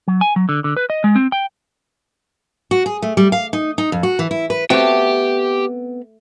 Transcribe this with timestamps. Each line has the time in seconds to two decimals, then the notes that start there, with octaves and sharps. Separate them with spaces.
0.08 F#3
0.21 G#5
0.36 F#3
0.49 D3
0.64 D3
0.77 B4
0.90 D#5
1.04 G#3
1.16 C4
1.32 G5
2.71 F#4
2.86 G#4
3.02 A3
3.17 G3
3.32 F5
3.53 D#4
3.78 D#4
3.92 F2
4.03 F#4
4.19 E3
4.31 E4
4.50 B4
4.70 A3 B3 C4 F#4 G4 G5